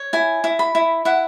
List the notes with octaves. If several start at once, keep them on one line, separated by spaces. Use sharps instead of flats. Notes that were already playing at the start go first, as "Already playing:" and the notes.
Already playing: C#5
E4 G#5
E4
B5
E4
E4 F#5